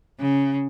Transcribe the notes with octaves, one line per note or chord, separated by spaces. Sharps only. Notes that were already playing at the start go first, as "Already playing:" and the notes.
C#3